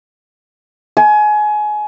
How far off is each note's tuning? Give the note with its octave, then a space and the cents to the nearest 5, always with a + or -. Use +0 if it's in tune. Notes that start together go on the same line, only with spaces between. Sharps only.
G#5 +25